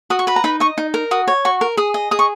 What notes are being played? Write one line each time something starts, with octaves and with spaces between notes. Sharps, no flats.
F#4 D#6
C#6
B4 B5
A#5
D#4 B5
D#5 C#6
D#4
A#4
F#4 D#6
C#5
F#4 C#6
A#4
G#4 D#6
D#5
G#4 D#6
C#6